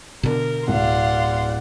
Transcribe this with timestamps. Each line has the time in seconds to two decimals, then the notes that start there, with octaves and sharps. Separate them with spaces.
0.23 B2 D3 A#4
0.68 D1 D5 F5 F#5 C6